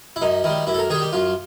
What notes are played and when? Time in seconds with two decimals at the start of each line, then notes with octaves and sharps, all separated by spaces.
0.16 E4
0.21 F#2 D#4
0.44 D#3 E4
0.49 G3
0.67 F#2 E4
0.74 A4
0.79 A#4
0.90 D#3 G3 G#4
1.02 G4
1.13 F#2 F4